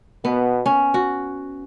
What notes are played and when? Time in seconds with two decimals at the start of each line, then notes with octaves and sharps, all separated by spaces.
0.24 B2 B3
0.66 C#4
0.94 F#4